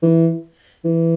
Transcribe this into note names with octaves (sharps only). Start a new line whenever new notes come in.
E3
E3